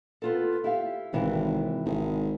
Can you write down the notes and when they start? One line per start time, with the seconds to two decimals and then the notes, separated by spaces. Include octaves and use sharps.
0.22 B3 F4 A4
0.64 E4 G4 F5
1.13 G#1 D#2 C3 E3
1.86 G#1 C3 G#4